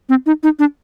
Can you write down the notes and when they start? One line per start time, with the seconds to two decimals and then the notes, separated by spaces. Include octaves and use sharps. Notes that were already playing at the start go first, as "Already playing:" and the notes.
0.09 C4
0.26 D#4
0.43 D#4
0.59 D4